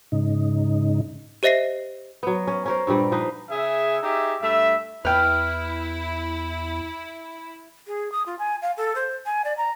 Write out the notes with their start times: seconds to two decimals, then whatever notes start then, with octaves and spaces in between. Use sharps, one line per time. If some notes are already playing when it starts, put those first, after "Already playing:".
0.12 G#2 C#3 D#4
1.43 G4 C5 D#5 E5 A#6 C7
2.23 F#3 B3
2.47 C#4
2.66 C#4 A#4 C5
2.87 G2 A#2 G3 D5
3.12 F3 D#4 B4 C5
3.50 C#3 G#4 E5
4.03 D#4 G4 G#4 E5
4.42 G2 A3 E5
5.05 E2 E4 B4 G5 F6
7.87 G#4
8.12 D#6
8.26 F4
8.39 G#5
8.62 F5
8.77 A4
8.95 C5
9.26 G#5
9.45 D5
9.58 A#5